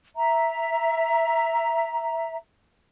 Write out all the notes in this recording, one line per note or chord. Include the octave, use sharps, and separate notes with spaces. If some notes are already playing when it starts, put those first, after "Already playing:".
E5 A#5